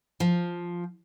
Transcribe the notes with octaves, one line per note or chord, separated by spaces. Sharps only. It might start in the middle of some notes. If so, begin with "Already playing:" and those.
F3